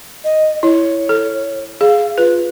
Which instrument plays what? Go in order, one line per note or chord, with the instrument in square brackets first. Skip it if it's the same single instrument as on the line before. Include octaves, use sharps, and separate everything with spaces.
[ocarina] D#5
[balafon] E4 [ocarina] C#5
[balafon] A4
[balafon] G#4 [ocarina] F5
[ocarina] F4 [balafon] B4